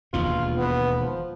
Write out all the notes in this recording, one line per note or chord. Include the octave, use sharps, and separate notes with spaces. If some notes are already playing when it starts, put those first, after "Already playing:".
E1 D#2 B2 F4
B3
F3